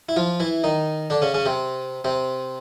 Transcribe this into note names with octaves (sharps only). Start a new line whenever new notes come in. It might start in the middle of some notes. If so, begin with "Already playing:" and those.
E4
F3 F4
E3 E4
D#3 D#4
D3 D4
C#3 C#4
C#3 C#4
C3 C4
C3 C4